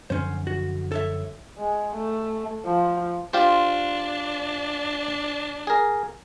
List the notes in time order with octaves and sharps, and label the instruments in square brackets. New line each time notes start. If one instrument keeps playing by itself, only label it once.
[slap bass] F#2 D3 F3 [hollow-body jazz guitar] C#4 C5
[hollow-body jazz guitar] F#4
A4 C#5 E5
[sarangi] G#3
A3
F3
[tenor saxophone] D4 [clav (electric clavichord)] F4 G4 C5
[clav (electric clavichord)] G#4 A#4